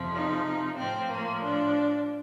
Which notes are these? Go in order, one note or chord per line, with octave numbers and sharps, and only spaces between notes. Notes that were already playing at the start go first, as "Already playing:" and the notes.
Already playing: F2 C3 F3
D#4
A2 F3 C4
A#3
D4